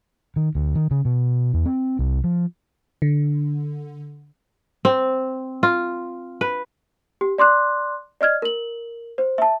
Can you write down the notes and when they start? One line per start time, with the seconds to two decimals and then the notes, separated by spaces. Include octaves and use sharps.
0.36 D#3
0.55 D2
0.75 D#3
0.91 C#3
1.05 B2
1.54 E2
1.66 C4
1.99 C2
2.24 F3
3.02 D3
4.85 C4
5.63 F4
6.41 B4
7.21 G4
7.38 D5 C6 D6 F#6
8.21 D5 D#5 F6 G#6
8.42 A#4 F#7
9.18 C5
9.38 E5 A5